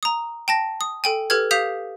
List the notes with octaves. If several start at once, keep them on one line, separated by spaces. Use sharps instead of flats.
A#5 D#6
G5 A5 A#6
D#6
A4 G5 G#5
G4 A4 B4 F6 G#6
G4 F5 D#6 G6 B6 F7